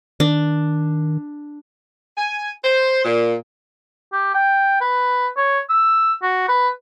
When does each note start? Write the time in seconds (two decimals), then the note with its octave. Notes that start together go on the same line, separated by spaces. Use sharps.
0.20 D#3 D4
2.17 G#5
2.64 C5
3.04 A#2
4.13 G4
4.34 G5
4.81 B4
5.37 C#5
5.70 E6
6.23 F#4
6.48 B4